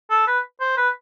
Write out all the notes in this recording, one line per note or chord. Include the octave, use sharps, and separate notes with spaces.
A4
B4
C5
B4